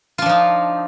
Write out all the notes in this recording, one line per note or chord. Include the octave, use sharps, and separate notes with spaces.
F3 D4 D#4 F4